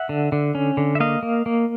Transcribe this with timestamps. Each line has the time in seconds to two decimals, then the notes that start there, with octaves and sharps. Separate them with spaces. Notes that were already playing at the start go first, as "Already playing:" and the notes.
Already playing: E5 F#5
0.09 D3
0.32 D3
0.55 C#4
0.77 D3
0.95 E5
1.00 A#3 D#5 F5
1.23 A#3
1.46 A#3